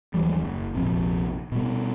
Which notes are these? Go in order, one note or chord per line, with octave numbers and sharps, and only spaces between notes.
D#2 E3 F#3 G3
F#1
A#1 F2 C3
B2 G3